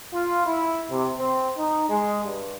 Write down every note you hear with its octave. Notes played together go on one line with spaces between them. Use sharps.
F4
E4
C3
C4
D#4
G#3
G2